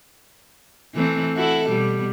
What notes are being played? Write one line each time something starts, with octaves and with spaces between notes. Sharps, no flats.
E3 A3 C4
E4 F#4 A4
B2 G3